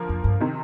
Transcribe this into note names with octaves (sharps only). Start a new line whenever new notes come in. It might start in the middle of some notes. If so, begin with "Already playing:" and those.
Already playing: D3 F3 A#3
F2
G2
C3 D#3